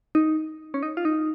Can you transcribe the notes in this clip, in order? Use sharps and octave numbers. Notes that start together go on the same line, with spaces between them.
D#4
C#4
D#4
F4
D#4